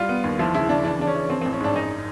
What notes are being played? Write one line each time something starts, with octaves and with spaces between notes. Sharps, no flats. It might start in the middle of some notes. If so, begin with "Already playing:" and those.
Already playing: G3 F4
B3
D#2
F3 E4
C#3 E4
C#3 D4
E3 D4
C#3 D4
C#4
E3
F3 C4
A1 C4
C#4
G#2 D4
F#2 D#4